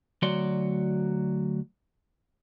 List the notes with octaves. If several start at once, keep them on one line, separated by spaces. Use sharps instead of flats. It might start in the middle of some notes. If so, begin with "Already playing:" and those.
D2 F#3 F#4 C#5 D5 C6